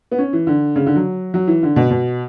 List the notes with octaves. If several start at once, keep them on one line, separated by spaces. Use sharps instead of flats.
B3
C#4
E3
D3
C#3
D3
F#3
F#3
E3
D3
B2
B2